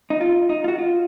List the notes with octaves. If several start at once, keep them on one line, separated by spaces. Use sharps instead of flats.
D#4
F4
D#4
F4
F#4
F4